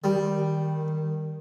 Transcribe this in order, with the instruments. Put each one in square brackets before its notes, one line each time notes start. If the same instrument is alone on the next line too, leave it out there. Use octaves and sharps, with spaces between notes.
[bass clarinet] D#3 [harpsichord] G3